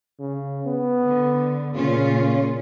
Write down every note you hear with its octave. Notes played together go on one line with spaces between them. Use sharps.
C#3
B3
D3
A#2 C#3 C#4 F4